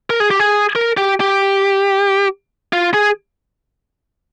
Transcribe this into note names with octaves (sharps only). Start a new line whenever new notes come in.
A#4
G#4
G4
G#4
A#4
G4
G4
F4
G#4